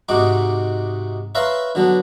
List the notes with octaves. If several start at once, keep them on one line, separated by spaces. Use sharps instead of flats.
G#2 C3 D#4 F#4 D6
B4 C#5 E5 F5 A#5 C6
D3 F#3 B3